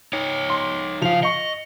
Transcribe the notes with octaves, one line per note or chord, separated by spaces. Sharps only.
D#4 C#5
C6
C#3 F3 F5 F7
D#5 C#6 C#7